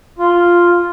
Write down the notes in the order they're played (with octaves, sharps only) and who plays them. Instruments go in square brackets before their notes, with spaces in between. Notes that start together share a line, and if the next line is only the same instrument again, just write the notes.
[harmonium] F4